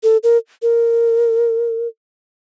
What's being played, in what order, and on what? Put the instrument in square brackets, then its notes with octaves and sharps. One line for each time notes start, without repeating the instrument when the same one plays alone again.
[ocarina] A4
A#4
A#4